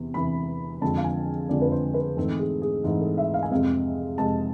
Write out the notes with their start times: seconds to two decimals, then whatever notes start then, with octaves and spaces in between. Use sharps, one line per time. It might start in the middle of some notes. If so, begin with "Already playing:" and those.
Already playing: E2 C3 E3
0.14 E2 C3 E3 B5
0.82 F2 D3 F3 G#3 C4 A5
0.97 F5
1.04 G#5
1.49 F2 D3 F3 G#3 C4 D5
1.62 B4
1.72 C5
1.94 B4
2.17 G#2 E3 A3 C4 A4
2.39 G#4
2.62 G#4
2.84 G#2 E3 A3 C4
3.01 A4
3.18 E5
3.34 F5
3.43 G#5
3.51 F2 C3 G#3 C4 F5
4.18 F2 C3 G#3 C4 A5